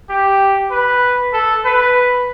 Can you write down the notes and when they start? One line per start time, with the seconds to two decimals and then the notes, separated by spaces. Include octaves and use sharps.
0.09 G4
0.71 B4
1.33 A4
1.65 B4